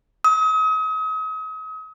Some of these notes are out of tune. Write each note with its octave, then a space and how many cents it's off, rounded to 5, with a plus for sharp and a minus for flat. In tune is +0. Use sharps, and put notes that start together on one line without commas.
D#6 +40